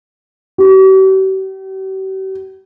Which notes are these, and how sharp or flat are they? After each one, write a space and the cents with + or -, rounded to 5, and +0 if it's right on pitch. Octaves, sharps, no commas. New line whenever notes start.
G4 -45